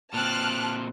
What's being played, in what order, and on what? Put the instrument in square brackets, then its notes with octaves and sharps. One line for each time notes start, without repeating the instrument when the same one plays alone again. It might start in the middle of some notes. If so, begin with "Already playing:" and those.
[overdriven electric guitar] A#2 C4 [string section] A5 F6 F#6